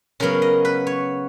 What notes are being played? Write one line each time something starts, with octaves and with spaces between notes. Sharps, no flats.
C#3 F#3 B3 A#4
D#5
B4
C#5